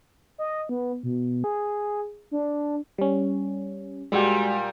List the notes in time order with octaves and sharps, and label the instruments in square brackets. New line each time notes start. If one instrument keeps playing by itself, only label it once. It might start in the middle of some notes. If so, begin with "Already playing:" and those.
[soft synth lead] D#5
B3
B2
G#4
D4
[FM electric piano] G3 C#4
[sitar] A#2 G3 [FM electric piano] G#3 F#4 G4